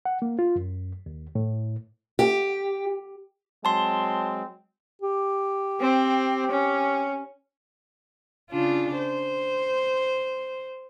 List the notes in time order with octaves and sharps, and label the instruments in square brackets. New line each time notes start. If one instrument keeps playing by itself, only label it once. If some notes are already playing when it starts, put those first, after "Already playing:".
[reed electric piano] F#5
A#3
F4
F#2
D#2
A2
[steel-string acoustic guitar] G4
[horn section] F#3 G#3 C4 [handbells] A5 C6
[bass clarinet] G4
[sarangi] C4
C#4
[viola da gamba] C#3 D4 F4
C5